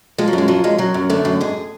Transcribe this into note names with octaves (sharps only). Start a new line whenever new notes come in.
F3 G#3
F#3
F#2
G#3
F3 F#3
F#2 G#3
F#2 F#3
F#2
D3 A3
F#2
G#2 G#4